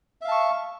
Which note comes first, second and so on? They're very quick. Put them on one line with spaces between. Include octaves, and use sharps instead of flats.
E5 F5 A5 C#6